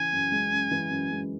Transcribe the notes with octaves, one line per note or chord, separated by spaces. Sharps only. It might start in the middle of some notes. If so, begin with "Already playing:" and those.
Already playing: C#3 E3 G#5
F#2
G#3
C#3
E3
F#2
G#3